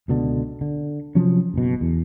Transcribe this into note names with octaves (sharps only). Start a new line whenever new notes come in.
C#2 B2 D3
D3
C3 F3 F#3 C#4
F#1 B2
E2